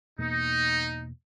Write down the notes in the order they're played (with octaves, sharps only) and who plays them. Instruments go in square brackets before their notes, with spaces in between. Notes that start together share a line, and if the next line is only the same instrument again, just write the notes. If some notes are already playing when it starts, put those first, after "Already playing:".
[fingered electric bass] E2 B2 A#3 [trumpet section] D#4